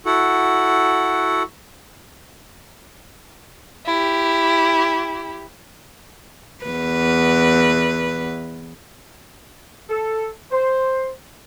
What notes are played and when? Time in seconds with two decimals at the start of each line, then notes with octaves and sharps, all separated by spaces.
0.06 E4 F#4 A4 F#5
3.85 E4 G4
6.65 E2 B4
9.90 A4
10.52 C5